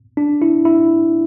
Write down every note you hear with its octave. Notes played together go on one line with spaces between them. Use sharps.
D4
E4
E4